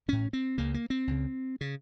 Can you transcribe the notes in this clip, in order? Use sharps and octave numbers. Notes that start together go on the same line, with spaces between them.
A1 A2 C#4
C4
C#2 C#3 A#3
A#3
C4
C#2 C#3
C#3